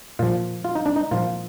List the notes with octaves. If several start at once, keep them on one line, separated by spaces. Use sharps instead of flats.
A#2 F3 F4
F4
D#4
D4
D#4
A#2 F3 F4